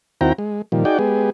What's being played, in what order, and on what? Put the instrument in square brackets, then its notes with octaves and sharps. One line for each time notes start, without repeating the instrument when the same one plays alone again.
[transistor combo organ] D#2 C4 E4 F#4 G5 A#5
G#3
A#2 D#3 F3 G3
D#4 F#4 G#4 D5 G5
G#3 B3 G4 G#4